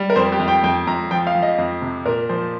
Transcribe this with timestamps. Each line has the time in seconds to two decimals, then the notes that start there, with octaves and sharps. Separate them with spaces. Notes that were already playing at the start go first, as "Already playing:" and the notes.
Already playing: G3
0.10 A#4
0.16 F2 C5
0.32 G4
0.39 F2
0.48 G5
0.64 F2 G5
0.87 F2 A#5
1.11 F3 G5
1.27 F5
1.35 F3
1.42 D#5
1.58 F2
1.82 C3
2.06 A#2 A#4
2.29 F3 C5